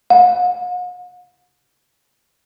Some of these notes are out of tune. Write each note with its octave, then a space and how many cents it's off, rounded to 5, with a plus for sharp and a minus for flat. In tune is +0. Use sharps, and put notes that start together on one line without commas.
F#5 -45